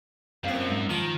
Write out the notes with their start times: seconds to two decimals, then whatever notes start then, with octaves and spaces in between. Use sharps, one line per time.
0.44 A#1 F#2 C4 F5
0.68 G#2
0.90 D#3 F3 A5